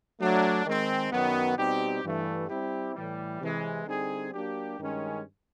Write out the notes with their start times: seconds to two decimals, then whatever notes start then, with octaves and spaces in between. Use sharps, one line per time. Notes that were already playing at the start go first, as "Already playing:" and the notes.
0.21 F#3 A3 D4
0.66 D#3 G#3 C4
1.12 F#2 D#3 F#3 B3
1.58 B2 G3 C4 D#4 G4
2.04 G2 E3 A3
2.49 G3 C4 E4 G4
2.95 A2 E3 G3
3.40 C3 E3 G#3
3.86 D3 G3 C4 D#4 G#4
4.32 F#3 A#3 D4 G4
4.78 G2 D#3 G#3 C#4